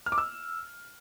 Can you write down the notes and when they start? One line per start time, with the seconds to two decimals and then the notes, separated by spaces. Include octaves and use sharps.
0.06 F6
0.12 D6
0.18 E6